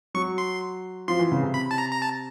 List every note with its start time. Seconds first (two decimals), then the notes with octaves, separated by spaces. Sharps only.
0.14 F#3 C#6
0.38 C6
1.08 F3 C6
1.19 E3
1.32 C#3
1.43 C3
1.54 B5
1.71 A5
1.78 A#5
1.92 A#5
2.02 A5